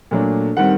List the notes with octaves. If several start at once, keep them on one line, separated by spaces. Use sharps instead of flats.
A#2 F#3 A3 D4
D#3 G3 C4 F#5